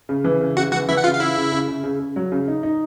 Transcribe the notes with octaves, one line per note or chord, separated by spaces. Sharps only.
C#3
E3
C#3
C#3 F#4 F#5
E3 F#4 F#5
E3 E4 E5
F#5
C#3 F4 F5
F5
C#3 E4 E5
C#3
C#3
C#3
C#3
C#3
F#3
C#3
D#4
D#4